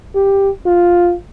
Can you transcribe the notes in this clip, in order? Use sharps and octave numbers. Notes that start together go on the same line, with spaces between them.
G4
F4